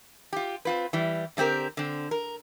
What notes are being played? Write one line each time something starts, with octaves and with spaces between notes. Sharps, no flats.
F4 G4
C4 F4 B4
E3 G3
D3 A3 C4 G4 A#4
D3 C4
A#4